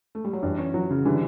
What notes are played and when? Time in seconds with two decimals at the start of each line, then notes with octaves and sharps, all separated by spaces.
0.15 A3
0.25 G3
0.33 F#3
0.42 G2 E3
0.58 C#4
0.74 F#3
0.90 C#3
1.05 D3 E3 G3